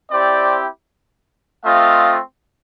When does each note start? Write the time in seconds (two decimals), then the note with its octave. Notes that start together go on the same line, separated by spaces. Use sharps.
0.11 C4 E4 G4 C5 D5
1.64 A3 C4 F4 D#5 F5